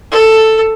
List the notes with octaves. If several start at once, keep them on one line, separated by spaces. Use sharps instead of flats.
A4